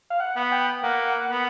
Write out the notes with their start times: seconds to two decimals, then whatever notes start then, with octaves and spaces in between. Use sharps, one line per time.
0.10 F5
0.20 F#5
0.36 B3
0.52 G5
0.83 A#3 F#5
1.30 B3